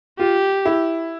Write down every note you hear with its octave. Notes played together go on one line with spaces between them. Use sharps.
F4 G4
E4